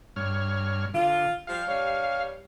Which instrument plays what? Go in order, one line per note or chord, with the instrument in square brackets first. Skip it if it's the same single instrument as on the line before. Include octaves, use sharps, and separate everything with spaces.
[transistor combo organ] G2 C#5 F6
[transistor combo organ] D3 [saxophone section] F4
[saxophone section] F3 G3 [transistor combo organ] F5
[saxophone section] G2 G3 C#5